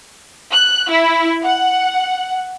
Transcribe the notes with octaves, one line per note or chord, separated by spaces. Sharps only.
F#6
E4
F#5